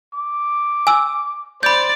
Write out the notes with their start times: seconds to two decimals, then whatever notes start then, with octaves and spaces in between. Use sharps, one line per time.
0.14 D6
0.87 G#5 E6
1.63 C5 D5 B5 G6